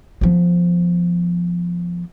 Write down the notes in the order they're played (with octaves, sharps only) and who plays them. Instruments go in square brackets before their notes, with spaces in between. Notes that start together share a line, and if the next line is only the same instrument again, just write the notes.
[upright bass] F3 B3